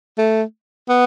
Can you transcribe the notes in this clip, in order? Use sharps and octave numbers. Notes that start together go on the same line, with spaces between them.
A3
B3